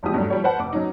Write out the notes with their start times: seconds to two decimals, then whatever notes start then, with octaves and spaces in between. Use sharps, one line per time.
0.03 F1 E2 G#2 F3 G4 D#6
0.14 G2 F#3 G3 A3
0.30 F3 G3 C#5
0.44 B4 C5 F#5 A5
0.59 F1 D6
0.73 F#3 C#4 D#4